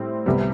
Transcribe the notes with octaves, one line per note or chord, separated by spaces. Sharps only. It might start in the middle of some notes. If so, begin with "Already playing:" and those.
Already playing: A2 G3 C4
C2 C3 G3 B3